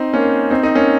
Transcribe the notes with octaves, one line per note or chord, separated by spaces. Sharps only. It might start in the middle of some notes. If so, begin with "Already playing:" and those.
Already playing: C4 D#4
A#3 C#4
C4 D#4
C4 D#4
A#3 C#4